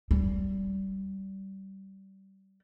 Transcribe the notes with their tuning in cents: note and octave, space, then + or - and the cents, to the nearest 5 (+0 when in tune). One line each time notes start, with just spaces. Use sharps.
G3 -25